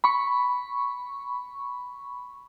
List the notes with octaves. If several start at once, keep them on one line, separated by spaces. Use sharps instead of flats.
B5 C#6